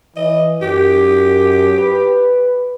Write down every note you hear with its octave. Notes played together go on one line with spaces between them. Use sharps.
E3 D#5
F#2 G4
B4